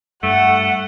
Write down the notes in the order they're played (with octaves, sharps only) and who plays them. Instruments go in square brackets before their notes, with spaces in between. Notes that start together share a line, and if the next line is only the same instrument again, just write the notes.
[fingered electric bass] G2 [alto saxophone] A3 [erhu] F#5